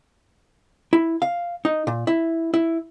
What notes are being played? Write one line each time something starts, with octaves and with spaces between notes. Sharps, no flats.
E4
F5
D#4
A#2
E4
E4